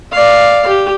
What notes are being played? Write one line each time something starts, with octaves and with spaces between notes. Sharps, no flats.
D5 F5
G4